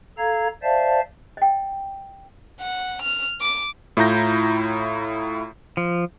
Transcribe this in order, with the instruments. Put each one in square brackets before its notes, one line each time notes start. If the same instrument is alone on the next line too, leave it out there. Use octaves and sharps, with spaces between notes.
[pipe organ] A4 F5 A#5 G#6
C5 D5 E5 F5 A5
[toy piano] D#5 G5
[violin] F#5
F6
D6
[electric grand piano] A2 E4 F4 A#5 G6 A#6
[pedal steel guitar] F3